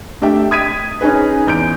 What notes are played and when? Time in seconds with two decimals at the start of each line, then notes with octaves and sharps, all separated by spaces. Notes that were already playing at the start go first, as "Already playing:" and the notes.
0.22 A3 D4 G4 E5 G5
0.51 D#6 G#6 B6 D#7
1.01 C#4 D#4 G#4 B4
1.47 E2 G6 D7